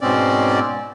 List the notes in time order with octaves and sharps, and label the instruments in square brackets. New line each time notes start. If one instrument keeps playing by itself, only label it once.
[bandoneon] G#2 B2 C4 C#4 D5